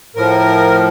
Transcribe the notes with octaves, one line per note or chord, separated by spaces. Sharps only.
A2 F3 A#4